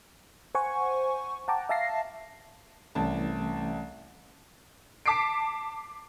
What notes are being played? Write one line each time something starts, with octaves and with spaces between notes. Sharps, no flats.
C5 F#5 G#5 C#6
F#5 G5 A5 A#5 D6
E5 F5 A5 A#6 C7
C2 E3 A3 C#4 A5
A5 D6 B6 C7 D7